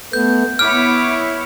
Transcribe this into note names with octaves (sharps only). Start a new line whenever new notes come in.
A3 B3 G6
B3 E4 C#5 D6 F6